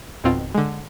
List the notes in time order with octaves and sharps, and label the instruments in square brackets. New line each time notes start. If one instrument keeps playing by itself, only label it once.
[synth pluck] G#1 F2 B2 C4 F4
D3 G#3